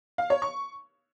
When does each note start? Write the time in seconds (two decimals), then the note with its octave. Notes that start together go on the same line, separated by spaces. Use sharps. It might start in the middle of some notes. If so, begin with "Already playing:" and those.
0.18 F5
0.30 C#5
0.42 C#6